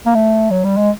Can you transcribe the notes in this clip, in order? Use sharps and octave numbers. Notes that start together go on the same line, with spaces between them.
A#3
A3
F#3
G3
G#3